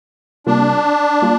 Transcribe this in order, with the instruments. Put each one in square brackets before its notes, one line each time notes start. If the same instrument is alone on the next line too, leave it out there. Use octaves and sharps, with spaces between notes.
[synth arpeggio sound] C3 G3 A#3 F4 [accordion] D4
[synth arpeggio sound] G3 A#3 F4